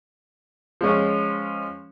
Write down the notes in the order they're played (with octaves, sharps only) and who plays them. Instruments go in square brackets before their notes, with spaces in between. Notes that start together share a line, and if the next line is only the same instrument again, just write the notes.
[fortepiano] F3 G#3 C#4